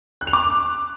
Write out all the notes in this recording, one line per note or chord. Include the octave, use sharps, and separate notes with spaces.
F#6
F7
D6